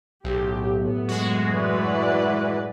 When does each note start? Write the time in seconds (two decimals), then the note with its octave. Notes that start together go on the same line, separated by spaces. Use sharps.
0.24 B1 F#2 A2 F#3 G4
0.79 B3
1.08 G#3 F#4
1.52 E3 B4 D5